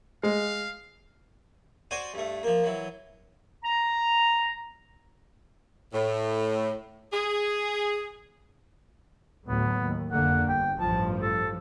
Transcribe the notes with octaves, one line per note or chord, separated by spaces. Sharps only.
G#3 F5
F#4 C5 D5 G#5
G2 A3
F3 A#3
E3 F#3
A#5
A2
G#4
D2 A2 F#3 B3
D#2
F1 D3 A#3 F#5
G1 G5
A1 G2 F3 A5
A4